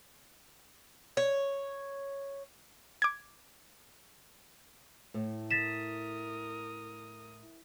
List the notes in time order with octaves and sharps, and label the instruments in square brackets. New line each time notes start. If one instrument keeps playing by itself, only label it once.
[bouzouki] C#5
[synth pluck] D6 G#6
[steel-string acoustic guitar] A2
[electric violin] A#4 D#6 [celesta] A6 B6 E7